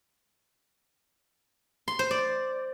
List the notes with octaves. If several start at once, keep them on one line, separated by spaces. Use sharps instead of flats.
C6
C5
D5